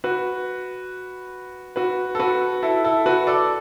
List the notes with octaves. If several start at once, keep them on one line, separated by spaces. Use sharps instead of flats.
F#4 B4
F#4 B4
A4
F#4 B4
E4 A4
E4 A4
F#4 B4
A4 D5